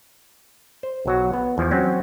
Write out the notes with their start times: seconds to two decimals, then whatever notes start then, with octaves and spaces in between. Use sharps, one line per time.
0.83 C5
1.06 B1 F#3 F#4
1.33 B3
1.58 E2 F3
1.71 F#3 C4 C#4